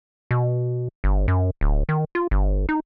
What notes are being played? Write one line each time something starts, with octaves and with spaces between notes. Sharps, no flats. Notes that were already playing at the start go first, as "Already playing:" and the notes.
B2
G1
F#2
D1
D#3
F4
G1
D#4